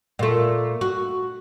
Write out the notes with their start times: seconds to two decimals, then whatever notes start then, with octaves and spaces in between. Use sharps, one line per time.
0.19 A#2 A3
0.81 F#4